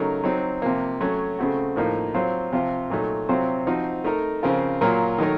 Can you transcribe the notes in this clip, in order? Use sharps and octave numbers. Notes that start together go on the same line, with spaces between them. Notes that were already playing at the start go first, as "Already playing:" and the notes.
Already playing: C#3 F#3 A3 D#4 A#4
F#3 C4 D#4
C3 F3 A#3
F#3 A3 C#4
C#3 A3 C4 F#4
A2 F3 A#3 D#4 A#4
F#3 C4 F4 C5
C3 F3 C4 F4
A#2 F#3 A3 D#4
C3 F#3 C4 F4 C5
F3 C4 D#4 F#4
A3 D#4 A#4
C#3 F3 C4 F4 A#4
A#2 F#3 A#3 F4 A#4
D#3 F#3 A3 D#4 A#4